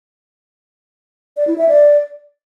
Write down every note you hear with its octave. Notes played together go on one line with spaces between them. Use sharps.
D5
E4
E5
D5